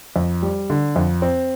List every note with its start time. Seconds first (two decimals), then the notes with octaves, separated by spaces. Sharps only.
0.16 F2
0.42 G3
0.70 D3
0.96 F2
1.22 C4